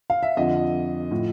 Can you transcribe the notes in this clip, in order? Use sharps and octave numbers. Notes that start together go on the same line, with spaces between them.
F5
E5
F2 D3 F3 D#5
A2 F3